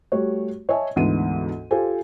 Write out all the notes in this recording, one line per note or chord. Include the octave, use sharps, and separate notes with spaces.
G3 A3 F#4 C#5
C#5 D#5 E5 G#5 A5
D2 G#2 E3 B3 D#7
F4 G4 A4 C5 G#5